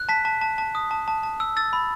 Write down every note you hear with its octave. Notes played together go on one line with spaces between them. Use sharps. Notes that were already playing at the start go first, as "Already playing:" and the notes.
Already playing: F#6
A5 B6
A5
A5
A5
D#6
A5
A5
A5
E6
E6 A6
B5